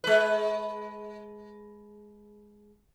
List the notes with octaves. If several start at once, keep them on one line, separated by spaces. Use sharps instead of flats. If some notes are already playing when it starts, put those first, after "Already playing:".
G#3 B4